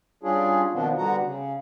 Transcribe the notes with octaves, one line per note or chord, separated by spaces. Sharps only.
G3 C#4 D4 F4 G#4
B2 D#3 F3 B3 C4 D4
D3 G3 B3 F#4 F#5 A#5
C#3